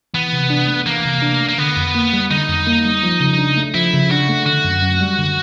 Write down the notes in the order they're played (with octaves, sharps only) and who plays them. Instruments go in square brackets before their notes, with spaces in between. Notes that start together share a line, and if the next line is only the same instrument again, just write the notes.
[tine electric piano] E3 [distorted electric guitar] B3
[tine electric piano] C3
D4
A3
[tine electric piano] E3 [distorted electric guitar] A#3
[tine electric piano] C3
D4
A3
[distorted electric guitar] A#3
[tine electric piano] D3 [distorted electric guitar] B3
[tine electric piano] F2
A#3
G3
[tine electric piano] D3 [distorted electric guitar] D#4
[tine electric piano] F2
A#3
G3
F3
C#3
D4
A3
[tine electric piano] F3 [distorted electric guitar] E4
[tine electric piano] C#3
[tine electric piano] D4 [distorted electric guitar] F#4
[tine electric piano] A3
[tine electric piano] D3 [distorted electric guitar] F#4
[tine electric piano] F#2
F#2
G3
D3